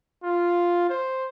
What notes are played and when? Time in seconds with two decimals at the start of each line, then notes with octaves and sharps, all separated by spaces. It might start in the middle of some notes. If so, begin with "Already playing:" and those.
0.23 F4
0.89 C5